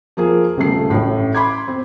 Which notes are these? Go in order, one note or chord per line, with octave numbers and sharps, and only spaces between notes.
F3 A#3 G#4
D#1 C#3 A3 C7
A1 A2
B5 C6 D6 G#6
C4